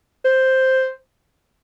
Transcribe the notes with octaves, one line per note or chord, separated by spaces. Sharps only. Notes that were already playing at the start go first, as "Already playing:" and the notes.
C5